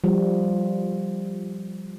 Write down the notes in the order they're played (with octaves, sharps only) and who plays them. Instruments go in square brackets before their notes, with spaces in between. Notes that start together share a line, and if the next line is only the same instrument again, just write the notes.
[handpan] F3 G3